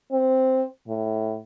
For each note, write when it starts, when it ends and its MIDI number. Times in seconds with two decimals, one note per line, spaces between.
0.12 0.65 60
0.88 1.40 45